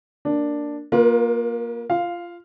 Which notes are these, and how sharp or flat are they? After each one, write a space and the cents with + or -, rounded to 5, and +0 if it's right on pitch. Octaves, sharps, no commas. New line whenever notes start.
A#3 +0 D4 +0
A#3 +10 F4 +20 B4 -45
F4 -20 F5 +0